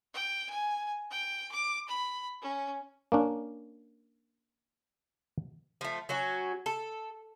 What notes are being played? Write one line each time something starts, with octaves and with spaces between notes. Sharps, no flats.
G5
G#5
G5
D6
B5
C#4
A#3 C#4 D4
F3 A3
F#3 C#4 F#4
A4